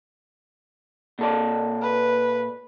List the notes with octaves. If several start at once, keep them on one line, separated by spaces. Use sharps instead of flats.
A#2 A4 D5
B4